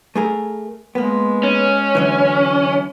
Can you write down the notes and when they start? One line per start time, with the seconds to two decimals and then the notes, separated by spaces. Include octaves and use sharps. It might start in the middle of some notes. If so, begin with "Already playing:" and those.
0.16 A3 G#4 A#4
0.95 G#3 A#3 B3
1.43 C#4
1.95 F#2 D3 E3